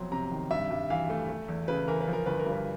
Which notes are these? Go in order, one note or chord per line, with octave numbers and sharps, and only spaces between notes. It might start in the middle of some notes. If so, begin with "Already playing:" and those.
Already playing: F2 B2 F#3 C6
C3 A#5
D#3
G2 E5
G2
E3 F5
A3
A3
E2
C#3 B4
E3 A#4
B4
F3
A#4
G1 B4
A#4
G2
B4